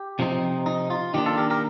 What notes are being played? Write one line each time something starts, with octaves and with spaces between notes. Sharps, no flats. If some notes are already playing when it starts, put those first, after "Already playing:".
Already playing: G4
C3 F3 C4 D#4
D#4
F4
D#3 A#3 D4 D#4 G4
F4 A4
G4 A#4
G4 A#4